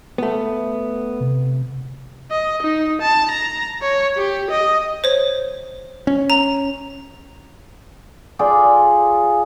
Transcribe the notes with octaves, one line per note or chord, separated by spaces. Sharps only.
A3 B3
C3
D#5
D#4
A5
A#5
C#5
G4
D#5
C5 C#5
C#4
A#5
F4 G#4 D5 G5